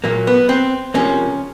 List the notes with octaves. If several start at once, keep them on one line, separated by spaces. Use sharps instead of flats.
A#2 F#3 A#3
B3
C4
C#2 C3 F3 A#3 C#4